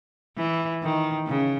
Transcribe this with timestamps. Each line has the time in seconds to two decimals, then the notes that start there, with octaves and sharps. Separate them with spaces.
0.38 E3
0.83 D#3
1.28 C#3